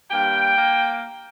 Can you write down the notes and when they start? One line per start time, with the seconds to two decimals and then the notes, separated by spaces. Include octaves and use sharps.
0.11 G2 G3 A#3 G5
0.57 A#3